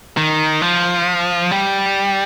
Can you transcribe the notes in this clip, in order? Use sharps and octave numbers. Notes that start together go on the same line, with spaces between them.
D#3
F3
G3